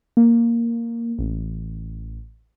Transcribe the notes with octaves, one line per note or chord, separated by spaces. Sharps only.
A#3
A1